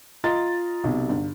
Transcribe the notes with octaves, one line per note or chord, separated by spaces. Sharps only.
F4 D#5 A#5 A6
B1 C3
G1